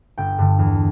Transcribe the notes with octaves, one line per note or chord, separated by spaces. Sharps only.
G1 G5
G2 D3
E2